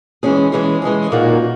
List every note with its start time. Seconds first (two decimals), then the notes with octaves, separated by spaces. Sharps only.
0.23 E3 G#3 C#4 G#4
0.52 E3 G#3 C#4 G#4
0.82 E3 G#3 C#4 G#4
1.12 A#2 A#3 D#4 F#4